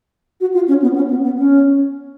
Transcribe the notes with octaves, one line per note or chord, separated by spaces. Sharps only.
F#4
F4
C#4
B3
C#4
B3
B3
C#4